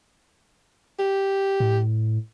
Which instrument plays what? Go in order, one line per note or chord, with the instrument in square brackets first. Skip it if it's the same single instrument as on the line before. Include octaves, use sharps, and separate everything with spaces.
[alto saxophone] G4
[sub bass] A2